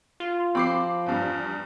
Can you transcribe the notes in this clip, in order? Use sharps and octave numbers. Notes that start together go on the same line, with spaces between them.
F4
F3 C4 B5 D6 C7
E2 G2